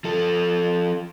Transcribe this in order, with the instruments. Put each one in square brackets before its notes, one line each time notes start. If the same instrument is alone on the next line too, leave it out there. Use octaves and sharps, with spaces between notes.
[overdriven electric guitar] F3 A4